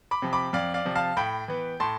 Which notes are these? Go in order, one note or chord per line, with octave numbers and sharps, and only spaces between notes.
B5 D6
C3 F3
B5 D6
F2 D5 F5
D5 F5
C3 F3
F5 A5
A2 G5 B5
E3 B3
A2 A5 C6